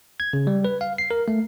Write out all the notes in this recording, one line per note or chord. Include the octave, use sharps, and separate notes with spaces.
G#6
C#3
G3
B4
F5
C7
A#4
A3